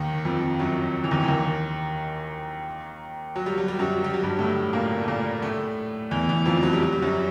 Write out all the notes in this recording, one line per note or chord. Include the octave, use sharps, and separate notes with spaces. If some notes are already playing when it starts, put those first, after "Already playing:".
Already playing: D#2 D#3
F2 F3
F#2 F#3
E3
D#2 D#3
E3
D#2 D#3
F#3
G3
F#3
G3
F#2 F#3
G3
F#3
G2 G3
A2 A3
A#2 A#3
A3
A#2 A#3
A2 A3
E2 E3
E2 E3
F2 F3
F#3
G3
F#3
G3
F#2 F#3